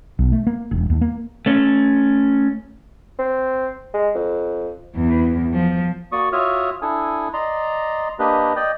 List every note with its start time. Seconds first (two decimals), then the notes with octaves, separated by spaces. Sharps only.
0.19 B1
0.32 A3
0.47 A#3
0.71 E1
0.90 D#2
1.01 A#3
1.46 A3 C#4
3.19 C4
3.94 G#3
4.15 F2
4.96 E2
5.53 F3
6.12 A#3 F#4 D5 C#6 D#6
6.32 F4 F#4 C#5 E5 D#6 F6
6.82 D4 E4 A4 G#5 D#6
7.33 D5 D#5 A#5 C6
8.19 A#3 D4 G4 B4 D#5
8.56 D5 D#5 G5